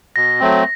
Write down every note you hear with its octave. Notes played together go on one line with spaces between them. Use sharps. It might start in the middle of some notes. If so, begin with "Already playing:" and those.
B2 A#6
F#3 A3 C4